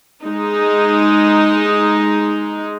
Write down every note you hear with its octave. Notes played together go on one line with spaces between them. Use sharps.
G#3 D#4